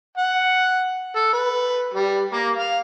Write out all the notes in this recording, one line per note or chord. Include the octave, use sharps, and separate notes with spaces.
F#5
A4
B4
G3
A#3
F5